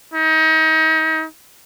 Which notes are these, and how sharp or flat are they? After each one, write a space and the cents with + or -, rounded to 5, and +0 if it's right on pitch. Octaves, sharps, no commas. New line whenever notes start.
D#4 +35